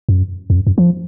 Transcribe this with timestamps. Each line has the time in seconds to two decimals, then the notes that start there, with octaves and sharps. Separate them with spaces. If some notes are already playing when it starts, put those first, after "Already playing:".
0.09 F#2
0.50 F2
0.56 F#2
0.67 F#2
0.78 F3